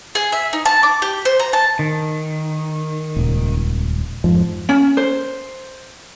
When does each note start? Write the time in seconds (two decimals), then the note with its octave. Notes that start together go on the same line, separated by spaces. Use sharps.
0.15 G#4
0.32 E5
0.53 D#4
0.66 A5
0.83 D6
1.02 G4
1.25 C5
1.40 A#5
1.53 A5
1.79 D#3
3.16 D#1 C#2
4.24 F2 G#2 F3
4.69 C#4
4.97 C5